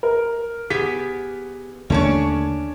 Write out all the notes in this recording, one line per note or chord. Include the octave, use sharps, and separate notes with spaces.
A#4
B3 G4 G#4 B6
D#2 D3 A3 C#4 D4 C#5